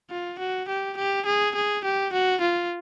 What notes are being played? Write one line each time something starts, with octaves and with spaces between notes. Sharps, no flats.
F4
F#4
G4
G4
G#4
G#4
G4
F#4
F4